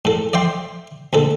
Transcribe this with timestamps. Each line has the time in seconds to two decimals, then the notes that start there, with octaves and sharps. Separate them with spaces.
0.05 A2 A4
0.33 D5 E5 G5 C6
1.13 D2 A#2 A4